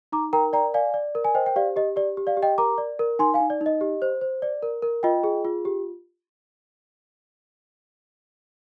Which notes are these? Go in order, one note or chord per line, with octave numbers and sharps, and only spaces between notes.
D#4 A#5 D6
A#4 G5 A#5
D5 G5 A#5
D5 F5 G#5
D5
A#4
G#5
C5 D#5 G5
G5
G4 D5 F5
G4 D#5
G4 D5
G4
D5 F5
G4
D#5 G5
A#4 A#5 D6
D5
A#4
D#4 G#5 C6
F5 G#5
D#4
D5
D#4
D#5
G4
C5
C5
D5
A#4
A#4
F4 D#5 G5
G#4
F4
G4